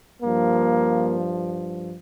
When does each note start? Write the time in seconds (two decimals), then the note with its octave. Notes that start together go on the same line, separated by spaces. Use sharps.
0.22 G2 F3 A#3